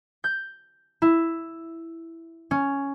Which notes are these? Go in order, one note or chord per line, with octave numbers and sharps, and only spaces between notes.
G6
E4
C#4